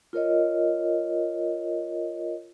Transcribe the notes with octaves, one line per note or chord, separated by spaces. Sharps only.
F4 A#4 C#5 D#5